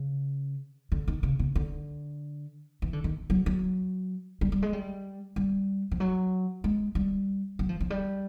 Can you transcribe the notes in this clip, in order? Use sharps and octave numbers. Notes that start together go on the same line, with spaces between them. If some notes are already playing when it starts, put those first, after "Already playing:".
Already playing: C#3
D3
D#3
C#3
C#3
D3
E3
D3
D#3
F#3
F#3
G3
G3
G#3
G3
G3
F3
F#3
G#3
G3
F#3
F3
F3
G3